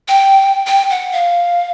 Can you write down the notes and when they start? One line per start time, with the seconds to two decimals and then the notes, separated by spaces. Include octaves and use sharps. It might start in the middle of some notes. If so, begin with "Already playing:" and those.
0.08 G5
0.67 G5
0.90 F#5
1.12 F5